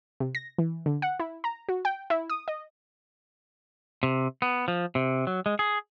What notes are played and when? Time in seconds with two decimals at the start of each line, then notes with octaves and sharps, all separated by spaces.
0.20 C3
0.35 A#6
0.58 E3
0.86 D3
1.02 F#5
1.20 E4
1.44 A#5
1.69 F#4
1.85 G5
2.10 E4
2.30 D#6
2.48 D#5
4.03 C3
4.42 B3
4.68 F3
4.95 C3
5.27 F#3
5.46 G#3
5.59 G#4